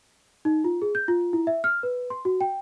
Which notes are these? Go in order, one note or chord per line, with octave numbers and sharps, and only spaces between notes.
D#4
F4
G#4
G6
F4
E4
E5
F6
B4
C6
F#4
G5